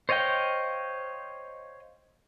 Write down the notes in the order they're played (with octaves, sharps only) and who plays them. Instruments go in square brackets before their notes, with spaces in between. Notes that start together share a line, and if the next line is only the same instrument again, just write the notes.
[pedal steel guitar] C5 C#5 D#5 F5 G5